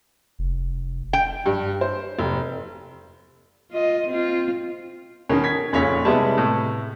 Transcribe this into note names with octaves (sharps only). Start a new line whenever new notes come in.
F1
G5
G2
C5
F1
F4 D#5
C4 F4
B2 D#3 C#4 A#4
G#6 B6
F1 A#2 C#3 C#4 C#5 B6
C3 G3 G#3 B3 E4 A5
A2